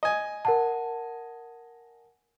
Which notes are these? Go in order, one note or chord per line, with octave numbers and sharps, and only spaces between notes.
D#5 G#5
A#4 F#5 A5